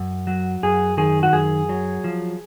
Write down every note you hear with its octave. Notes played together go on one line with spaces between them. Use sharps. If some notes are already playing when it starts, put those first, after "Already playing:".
Already playing: F#2
F#3
F#2 G#4
D#3 G#4
F#4
F#2 G#4
F#3
F3